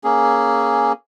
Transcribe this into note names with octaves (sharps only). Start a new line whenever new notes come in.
A#3 C#4 G#4